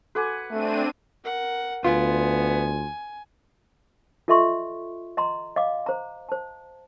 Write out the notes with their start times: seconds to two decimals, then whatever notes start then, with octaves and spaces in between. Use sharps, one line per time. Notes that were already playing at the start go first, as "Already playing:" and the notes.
0.15 F#4 A4 B4 F#5 G#5 D6
0.51 A3 C4 D4 D#7
1.24 A#4 F#5
1.84 D2 B3 F4 G#5
4.28 F4 A4 D#5 E5 C6 C#6
5.17 D#5 A#5 C6
5.56 D#5 F5 D6
5.86 C5 A#5
6.29 C5 A5